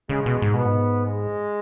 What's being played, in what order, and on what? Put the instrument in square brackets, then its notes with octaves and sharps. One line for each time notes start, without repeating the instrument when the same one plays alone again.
[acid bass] C#3 [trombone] G#3
[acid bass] B2
G#2
[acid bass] B2 [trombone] B3
[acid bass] G#2
[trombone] G#3